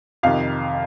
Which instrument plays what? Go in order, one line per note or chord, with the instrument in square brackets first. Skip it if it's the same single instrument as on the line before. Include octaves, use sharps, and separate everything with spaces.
[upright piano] F2 C3 D#3 F5